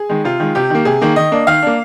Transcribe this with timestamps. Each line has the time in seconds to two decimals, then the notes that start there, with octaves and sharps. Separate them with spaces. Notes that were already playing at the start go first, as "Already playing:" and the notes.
Already playing: G#4
0.09 D#3 G#3
0.24 C3 F4
0.40 D#3 G#3
0.55 C3 G4
0.70 D#3 A#3
0.85 C3 G#4
1.01 D#3 A#3
1.16 D#3 D#5
1.32 A#3 D4
1.47 D#3 F5
1.62 A#3 D4